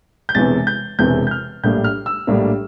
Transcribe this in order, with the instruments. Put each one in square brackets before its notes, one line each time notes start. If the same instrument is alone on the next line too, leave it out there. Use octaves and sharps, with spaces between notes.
[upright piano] G6
E1 E2 C3 E3 A6
G6
E1 E2 C3 E3 G6
G6
F6
A#1 A2 G3 A#3 D4 G6
F6
E6
A#1 A2 G3 A#3 D4